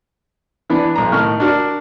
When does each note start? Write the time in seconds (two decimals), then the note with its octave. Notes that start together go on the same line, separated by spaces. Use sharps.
0.70 E3 B3 D4
0.95 B1 A#5
1.12 A2 D#3 C#6 F6
1.40 D4 F#4 A#4